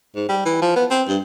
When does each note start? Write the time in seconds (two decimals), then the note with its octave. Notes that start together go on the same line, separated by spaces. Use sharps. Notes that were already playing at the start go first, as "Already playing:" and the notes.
0.15 G#2
0.29 G3
0.45 E3
0.62 F3
0.76 B3
0.90 C4
1.08 G2